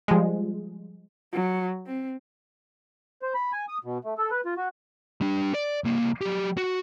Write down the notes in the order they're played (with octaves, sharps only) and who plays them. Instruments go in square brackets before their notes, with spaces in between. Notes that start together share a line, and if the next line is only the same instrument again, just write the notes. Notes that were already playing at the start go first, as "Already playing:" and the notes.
[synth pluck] F3 G3 G#3
[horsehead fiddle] F#3
C4
[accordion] C5
B5
G#5
D#6
B2
A3
A4
B4
F4
F#4
[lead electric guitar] G3 D4
D5
C2 A#3
F#3 G4
F#4